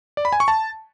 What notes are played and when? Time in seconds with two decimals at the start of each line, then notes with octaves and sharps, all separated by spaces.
0.17 D5
0.25 B5
0.33 G#5
0.40 C#6
0.48 A5